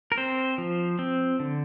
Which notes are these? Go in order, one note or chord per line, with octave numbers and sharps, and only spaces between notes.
A#4
C4 C5
F3
C4
D3